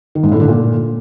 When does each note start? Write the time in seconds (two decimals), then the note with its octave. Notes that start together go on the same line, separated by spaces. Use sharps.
0.15 D#3
0.23 G#2
0.32 A2
0.40 D3
0.48 A#2